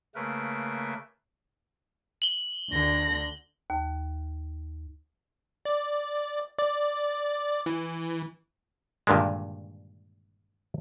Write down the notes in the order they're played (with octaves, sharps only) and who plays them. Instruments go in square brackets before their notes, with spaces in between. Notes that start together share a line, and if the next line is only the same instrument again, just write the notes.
[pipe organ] C#3 A3 A#3 A#4 B4
[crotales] F#7 G7
[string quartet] D2 D3 A#6
[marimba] D#2
[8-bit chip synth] D5
D5
E3
[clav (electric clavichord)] G2 A#2 D3 D#3 G#3